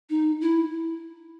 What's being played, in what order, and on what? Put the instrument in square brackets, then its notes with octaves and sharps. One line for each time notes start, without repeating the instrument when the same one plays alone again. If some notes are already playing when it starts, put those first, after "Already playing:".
[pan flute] D#4
E4